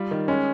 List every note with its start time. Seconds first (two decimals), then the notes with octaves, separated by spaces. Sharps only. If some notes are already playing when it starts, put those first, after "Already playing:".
Already playing: G3 F4
0.11 D#3
0.28 G#3 C#4